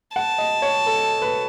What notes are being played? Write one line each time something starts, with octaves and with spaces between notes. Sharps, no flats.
F#5 A5
D#5
C#5
A4
B4